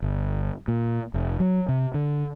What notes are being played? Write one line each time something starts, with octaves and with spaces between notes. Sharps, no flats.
G1
A#2
F1
F#3
C3
D3